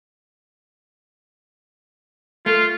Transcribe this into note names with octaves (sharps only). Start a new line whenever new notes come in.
A3 F4